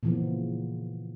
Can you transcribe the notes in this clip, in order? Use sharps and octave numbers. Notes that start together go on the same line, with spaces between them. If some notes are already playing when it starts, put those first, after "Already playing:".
A#2 C#3 E3 F3 A#3 B3